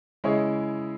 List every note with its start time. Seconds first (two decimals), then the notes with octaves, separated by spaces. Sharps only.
0.24 C#3 G#3 E4 G#4 C#5